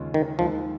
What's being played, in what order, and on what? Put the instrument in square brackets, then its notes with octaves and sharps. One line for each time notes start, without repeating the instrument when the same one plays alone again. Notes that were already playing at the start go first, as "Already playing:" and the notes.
Already playing: [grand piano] D#2 C#3 G#3 C#4 F4
[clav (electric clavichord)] D#3
[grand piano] D#2 D#3 G#3 [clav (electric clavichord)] F3